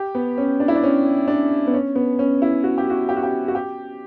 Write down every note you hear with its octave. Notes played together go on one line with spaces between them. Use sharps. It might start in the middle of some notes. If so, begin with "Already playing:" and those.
Already playing: G4
B3
C#4
D4
E4
D4
C#4
D4
B3
C#4
B3
C#4
E4
F#4
G4
F#4
G4
F#4
G4
F#4
G4